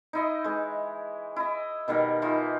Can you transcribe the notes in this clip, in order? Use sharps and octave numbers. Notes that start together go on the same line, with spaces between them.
D#4 E4 D#5
E3 G#3
E4 D#5
B2 D#3 G3 A#3
E3 D#4 F4